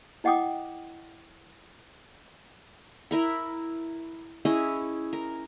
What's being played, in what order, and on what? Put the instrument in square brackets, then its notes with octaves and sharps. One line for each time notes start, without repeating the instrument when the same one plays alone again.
[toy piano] E4 D#5 F#5 G5 D6 D#6
[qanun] E4 A#4 B5
C#4 E4 G#4 D#5
A#4